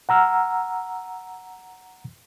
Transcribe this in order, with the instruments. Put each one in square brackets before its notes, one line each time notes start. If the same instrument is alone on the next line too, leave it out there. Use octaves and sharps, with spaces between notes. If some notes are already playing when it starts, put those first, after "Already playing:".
[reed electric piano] F#5 A#5 E6 F6